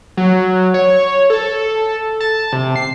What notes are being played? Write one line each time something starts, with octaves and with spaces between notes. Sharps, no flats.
F#3
C#5
A4
A5
C3
C7